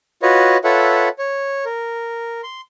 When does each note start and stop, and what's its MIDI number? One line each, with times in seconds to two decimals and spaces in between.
0.22 0.57 65
0.22 0.57 66
0.22 0.57 71
0.22 0.57 73
0.22 0.57 75
0.64 1.09 65
0.64 1.09 69
0.64 1.09 71
0.64 1.09 73
0.64 1.09 76
0.64 1.09 78
1.19 1.65 73
1.65 2.41 70
2.43 2.61 84